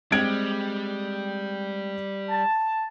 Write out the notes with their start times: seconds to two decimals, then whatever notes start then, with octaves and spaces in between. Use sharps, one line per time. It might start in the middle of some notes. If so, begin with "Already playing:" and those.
0.12 G3 G#3 C4 G#6 D7
2.30 A5